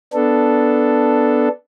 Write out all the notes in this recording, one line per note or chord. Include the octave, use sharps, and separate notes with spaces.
B3 D4 A4